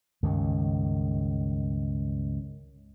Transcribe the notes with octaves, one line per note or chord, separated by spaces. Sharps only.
C#2 G2 D#3